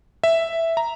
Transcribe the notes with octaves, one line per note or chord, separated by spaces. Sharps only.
E5
A#5